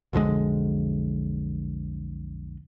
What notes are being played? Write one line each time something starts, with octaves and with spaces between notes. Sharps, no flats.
B1 F2 D3 G#3